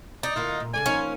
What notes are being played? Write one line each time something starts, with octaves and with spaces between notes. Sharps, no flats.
D#4 D5
D3 A#3 E4 F4
A#2
C#3 A4 D5 G#5
F3 A#3 C#4 D#4